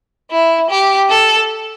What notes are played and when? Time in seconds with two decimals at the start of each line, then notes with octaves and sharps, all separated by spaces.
0.31 E4
0.70 G4
1.10 A4